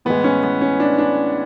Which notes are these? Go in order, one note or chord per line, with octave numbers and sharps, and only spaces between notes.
A2 E3 G#3 B3
C#4
B3
C#4
D4
D4